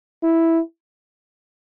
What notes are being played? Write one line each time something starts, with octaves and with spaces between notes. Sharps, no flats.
E4